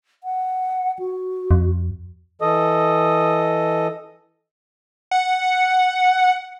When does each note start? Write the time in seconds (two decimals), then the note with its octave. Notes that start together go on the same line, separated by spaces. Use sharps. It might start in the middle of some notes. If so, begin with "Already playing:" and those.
0.24 F#5
0.99 F#4
1.51 F2
2.41 E3 A4 D#5 D#6
5.11 F#5